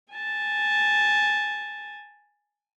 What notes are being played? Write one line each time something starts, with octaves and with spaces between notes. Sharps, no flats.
G#5 A5